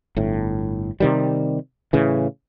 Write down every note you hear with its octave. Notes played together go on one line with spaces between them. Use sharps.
G1 A2
C3 D#3 G3
A2 C#3 E3